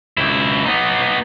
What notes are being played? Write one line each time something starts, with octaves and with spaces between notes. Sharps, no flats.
C#2 E4
B3 D#4